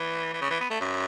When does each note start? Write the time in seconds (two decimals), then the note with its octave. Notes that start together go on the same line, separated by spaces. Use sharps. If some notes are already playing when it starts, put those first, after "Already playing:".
Already playing: E3
0.33 E3
0.41 C#3
0.50 E3
0.60 B3
0.70 A3
0.80 F#2